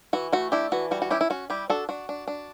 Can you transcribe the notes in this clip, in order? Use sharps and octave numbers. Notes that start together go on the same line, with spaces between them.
E3 F#4
A3 F#4
D4 E4 G4
E3 F#4
G3 F#4
F#4
C#4 E4 G4
E4
C#4 F#4
G3 E4 G4
D4 F#4 A4
D4 F#4
D4
D4